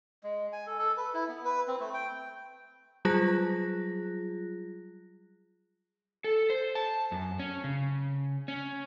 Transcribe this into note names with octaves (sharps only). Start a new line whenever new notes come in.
G#3
G#5
A4
A4
B4
E4
B3
B4
C4
A3
G5
F#3 G3 F4 G#4 F#6 A#6
A4
C5
A5
F#2
C#4
C#3
C#4